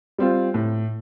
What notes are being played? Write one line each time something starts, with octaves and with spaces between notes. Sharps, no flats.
G3 C4 F4
A2